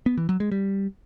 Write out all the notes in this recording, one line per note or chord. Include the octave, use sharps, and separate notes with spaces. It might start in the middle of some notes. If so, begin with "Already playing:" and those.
B3
E3
F#3
G#3
G3